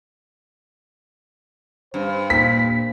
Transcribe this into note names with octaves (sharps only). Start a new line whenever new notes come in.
G2 C5
A#2 B6